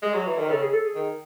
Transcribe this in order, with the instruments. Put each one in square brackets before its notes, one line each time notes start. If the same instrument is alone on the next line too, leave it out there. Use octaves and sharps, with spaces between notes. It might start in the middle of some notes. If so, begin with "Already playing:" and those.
[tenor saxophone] G#3
F#3
E3
D#3
[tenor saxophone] C#3 [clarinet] A4
[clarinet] G#4
A4
G#4
[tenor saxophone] D#3